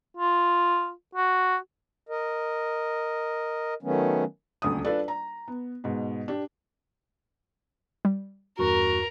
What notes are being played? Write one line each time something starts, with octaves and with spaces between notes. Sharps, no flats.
F4
F#4
A#4 D#5
D#3 F#3 A3 B3 C#4
D#1 D2 D#6
D4 F4 A4 B4 D5
A#5
B3
G#2 B2
D4 G4
G3
E2 G2 F#4 A#4